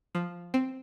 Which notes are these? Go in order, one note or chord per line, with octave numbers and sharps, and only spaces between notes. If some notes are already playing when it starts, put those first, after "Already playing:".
F3
C4